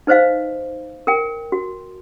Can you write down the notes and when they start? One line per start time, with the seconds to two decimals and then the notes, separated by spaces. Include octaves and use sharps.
0.07 D#4 B4 C5 D#5 F5
1.07 A#4 G5
1.52 F#4